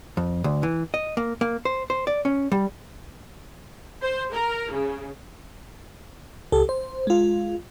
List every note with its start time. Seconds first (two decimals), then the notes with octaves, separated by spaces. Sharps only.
0.17 F2
0.44 D2
0.63 E3
0.94 D#5
1.17 A#3
1.41 A#3
1.65 C5
1.90 C5
2.07 D5
2.25 C#4
2.52 G3
4.02 C5
4.33 A#4
4.72 C#3
6.52 C#2 G4 A4
6.69 C5
7.07 G#3 F4